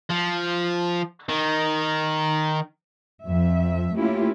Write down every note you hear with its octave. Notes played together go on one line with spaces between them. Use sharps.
F3
D#3
F2 E5
A3 A#3 C#4 E4 F4 G4